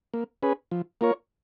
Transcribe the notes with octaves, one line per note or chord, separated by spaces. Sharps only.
A#3
C#4 G#4 B4
F3
A#3 F4 A#4 C#5